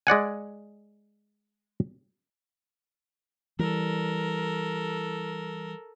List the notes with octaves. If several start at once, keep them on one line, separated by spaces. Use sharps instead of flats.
G#3 D5 F#5 G#5
E3 G3 A4 A#4